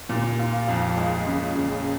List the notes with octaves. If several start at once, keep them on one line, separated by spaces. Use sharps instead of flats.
D#2 A#2
F4
F2 F4
G#3
C#3
C#3